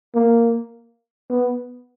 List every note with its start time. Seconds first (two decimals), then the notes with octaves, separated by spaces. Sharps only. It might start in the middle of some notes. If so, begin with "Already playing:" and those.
0.15 A#3
1.30 B3